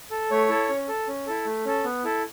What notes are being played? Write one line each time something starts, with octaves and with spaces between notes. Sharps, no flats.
A4
A3 C#5
E4 A4
C#4
A4
C#4
E4 A4
A3
C#4 A4
B3
E4 A4